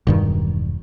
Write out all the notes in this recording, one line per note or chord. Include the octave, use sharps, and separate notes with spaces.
E1 G2 D#3